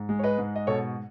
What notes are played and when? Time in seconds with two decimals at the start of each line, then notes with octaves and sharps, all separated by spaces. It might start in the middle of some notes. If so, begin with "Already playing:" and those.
Already playing: G#2
0.09 G#3
0.19 C#5
0.24 B4 D#5
0.38 G#2
0.56 D#5
0.67 B2 A4 C#5